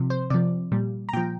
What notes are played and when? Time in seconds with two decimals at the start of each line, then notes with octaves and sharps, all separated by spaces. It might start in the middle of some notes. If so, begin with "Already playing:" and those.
Already playing: C3 F3
0.10 C5
0.30 C3 F3 D5
0.72 A#2 G3
1.09 A#5
1.13 A#2 F3 G5